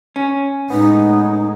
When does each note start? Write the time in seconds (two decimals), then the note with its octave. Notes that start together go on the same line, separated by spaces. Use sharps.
0.16 C#4
0.70 A2 G#3 B3 D#4